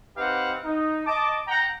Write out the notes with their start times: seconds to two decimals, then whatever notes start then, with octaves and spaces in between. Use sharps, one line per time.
0.17 C4 D#4 G4 B4 F5 F#5
0.64 D#4
1.06 D#5 A5 D6
1.48 F#5 G5 A#5